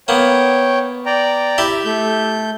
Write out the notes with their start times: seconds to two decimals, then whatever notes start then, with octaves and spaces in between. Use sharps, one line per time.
0.08 A#3 B3 C#5 G5
1.06 D5 G5 A#5
1.58 E4 G4
1.85 A3 G6